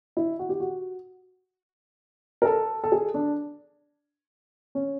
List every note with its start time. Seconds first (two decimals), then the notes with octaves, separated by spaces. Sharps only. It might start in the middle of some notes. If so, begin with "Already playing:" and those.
0.17 E4
0.39 F#4
0.49 G4
0.60 F#4
2.42 A#4
2.45 A4
2.84 A4
2.92 G#4
3.14 D4
4.75 C#4